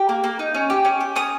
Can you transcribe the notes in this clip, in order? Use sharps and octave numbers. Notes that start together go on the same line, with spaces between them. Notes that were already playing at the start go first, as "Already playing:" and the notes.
Already playing: G4
A#3
A#3
D#4
C#4
G4
C#4
G4
C#4 D#6